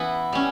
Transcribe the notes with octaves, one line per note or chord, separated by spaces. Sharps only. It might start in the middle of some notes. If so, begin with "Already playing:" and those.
Already playing: E3 B3 E4
G3 C#4